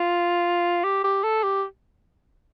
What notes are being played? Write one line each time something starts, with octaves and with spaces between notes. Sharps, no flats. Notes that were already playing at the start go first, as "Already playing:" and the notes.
Already playing: F4
G4
G4
A4
G4